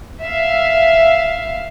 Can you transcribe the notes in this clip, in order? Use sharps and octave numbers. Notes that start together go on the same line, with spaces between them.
E5 F5